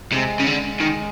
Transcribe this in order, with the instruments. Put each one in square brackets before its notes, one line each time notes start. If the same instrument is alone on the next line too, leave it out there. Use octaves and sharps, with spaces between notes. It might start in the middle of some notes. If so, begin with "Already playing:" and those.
[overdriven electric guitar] C3 [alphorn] G#3
[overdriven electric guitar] C#3
[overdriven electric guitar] D3 [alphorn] G#3
[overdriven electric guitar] D#3